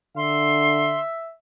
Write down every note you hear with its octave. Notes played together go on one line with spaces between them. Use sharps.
D3 E5 C6